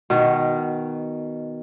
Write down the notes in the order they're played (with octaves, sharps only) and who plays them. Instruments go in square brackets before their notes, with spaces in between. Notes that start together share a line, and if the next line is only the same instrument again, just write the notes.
[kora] B2 D#3